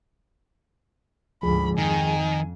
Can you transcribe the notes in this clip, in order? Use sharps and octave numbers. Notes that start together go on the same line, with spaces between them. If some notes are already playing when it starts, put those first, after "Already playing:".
D2 G#2 F3 G#4 B5
F2 D#3 G#5